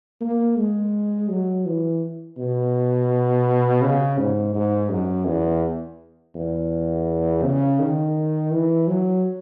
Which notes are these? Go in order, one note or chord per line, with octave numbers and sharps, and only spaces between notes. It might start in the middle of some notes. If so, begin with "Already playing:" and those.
A#3
G#3
F#3
E3
B2
C#3
G#2
G#2
F#2
E2
E2
C#3
D#3
E3
F#3